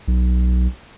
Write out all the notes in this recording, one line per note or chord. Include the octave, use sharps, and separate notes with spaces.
B1